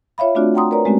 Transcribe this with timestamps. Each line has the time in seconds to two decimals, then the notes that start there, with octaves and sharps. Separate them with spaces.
0.18 F4 C#5 E5 F5 B5
0.35 A3 C4 D4 F4 F#4 D5
0.54 F#5 G5 A#5 C6 D#6
0.71 A#4 B4 C#5 D5 A#5
0.85 G#3 A3 C4 C#4 F#4 G4